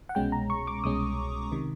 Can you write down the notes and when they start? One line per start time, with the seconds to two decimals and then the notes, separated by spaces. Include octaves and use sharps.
0.09 F#5
0.15 C2 B2 G#3 C#4 G5
0.32 A#5
0.50 C#6
0.67 D6
0.84 C2 B2 G#3 C#4 D#6
1.52 C3 D#3